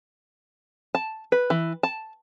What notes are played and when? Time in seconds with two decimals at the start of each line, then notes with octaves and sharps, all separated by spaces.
0.95 A5
1.32 B4
1.50 E3
1.83 A5